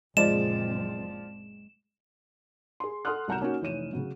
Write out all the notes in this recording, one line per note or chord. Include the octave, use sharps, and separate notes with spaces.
F#1 A#2 F3 G#3 C4 D5 E7
G#4 C6
A4 F#5 C6 D#6 F6 F#6
C2 F#3 F#5 A#5 G6 E7
A#3 C#4 D#4 F#4
F1 E3 C#5 D#7 E7
C#3 F#3